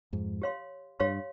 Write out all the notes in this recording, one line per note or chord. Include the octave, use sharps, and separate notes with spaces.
F2 G#2
G4 C#5 F5 C6
G2 G4 C#5 F5 C6